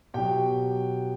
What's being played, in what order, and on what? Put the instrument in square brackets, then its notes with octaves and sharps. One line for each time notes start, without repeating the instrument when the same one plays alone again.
[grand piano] B2 F#3 G4 G5